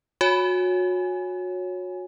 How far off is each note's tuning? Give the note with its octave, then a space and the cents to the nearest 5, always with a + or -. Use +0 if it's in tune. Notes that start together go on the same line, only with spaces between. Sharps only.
F#4 -30 C#5 +0 G#5 +0